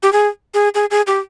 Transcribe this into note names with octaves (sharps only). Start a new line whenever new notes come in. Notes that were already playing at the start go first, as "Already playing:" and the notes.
G4
G#4
G#4
G#4
G#4
G4